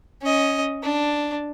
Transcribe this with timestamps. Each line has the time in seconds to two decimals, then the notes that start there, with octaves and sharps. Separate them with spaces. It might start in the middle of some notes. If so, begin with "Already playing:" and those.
0.21 C#4 D#5
0.83 D4